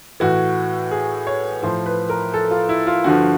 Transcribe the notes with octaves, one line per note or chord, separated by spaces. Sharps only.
A2 E3 F#4
G#4
C#5
A2 F3 C5
B4
A#4
A4
F4
E4
F4
G2 D3 F3 F#4